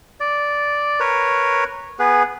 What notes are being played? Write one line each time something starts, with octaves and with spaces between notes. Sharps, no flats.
D5
A#4 B4 C#5
B3 G#4 B4